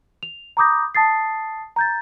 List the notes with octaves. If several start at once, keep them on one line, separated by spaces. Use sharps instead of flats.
F7
A#5 B5 D6 D#6 G6 A#6
A5 D#6 A6 C7
A#5 G6 A6